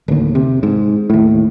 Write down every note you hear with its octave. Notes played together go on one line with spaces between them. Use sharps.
D1 D#2
C3
G#2
D#2 A2